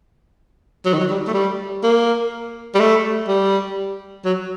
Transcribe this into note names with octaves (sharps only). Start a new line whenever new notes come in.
F#3
D#3
F#3
G3
A3
G3
A#3
G3
A3
G3
F#3